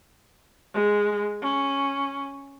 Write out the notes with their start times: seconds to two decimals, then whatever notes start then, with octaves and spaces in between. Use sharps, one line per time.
0.74 G#3
1.42 C#4